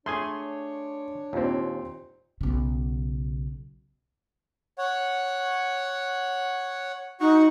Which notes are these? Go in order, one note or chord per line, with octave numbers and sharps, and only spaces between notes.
A3 D4 G#4 C#5 G#5 C6
D#2 A#2 C4
B1 C#3
C#5 F#5
D#4 F#4 F#5 C#6